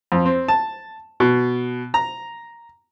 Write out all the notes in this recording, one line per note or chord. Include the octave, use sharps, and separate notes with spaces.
F2
C4
A5
B2
A#5